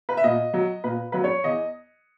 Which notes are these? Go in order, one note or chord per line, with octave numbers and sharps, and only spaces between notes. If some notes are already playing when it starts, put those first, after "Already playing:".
B4
E5
A#2 D#5
F#3
A#2 B4
F#3 B4
C#5
E2 D#5